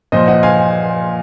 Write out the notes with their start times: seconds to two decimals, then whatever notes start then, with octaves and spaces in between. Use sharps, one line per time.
0.12 A#2 F3 C5 D#5
0.27 D#5 F#5
0.43 F5 G#5